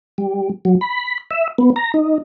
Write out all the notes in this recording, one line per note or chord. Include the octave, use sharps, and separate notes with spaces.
G3
F#3
B5
E5
B3
A#5
D#4